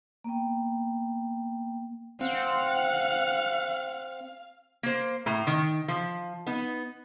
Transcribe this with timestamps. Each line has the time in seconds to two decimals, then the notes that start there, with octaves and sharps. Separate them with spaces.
0.24 A#3 B3 G5
2.21 C4 F5 F#5
4.83 A#3 C5
5.26 A2 A#5
5.47 D#3
5.88 F3
6.46 B3 D#4